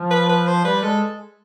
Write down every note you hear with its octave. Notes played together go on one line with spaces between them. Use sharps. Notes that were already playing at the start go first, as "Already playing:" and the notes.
Already playing: F3
B4
B4
C5
G3 B4
G#3 A4